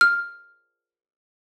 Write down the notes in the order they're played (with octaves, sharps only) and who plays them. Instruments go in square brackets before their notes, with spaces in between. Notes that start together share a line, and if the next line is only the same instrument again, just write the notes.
[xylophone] F6